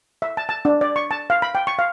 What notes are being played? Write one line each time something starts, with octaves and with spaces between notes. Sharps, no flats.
E5
A5
A5
D4
D5
C#6
A5
F5
B5
G5
C#6
F5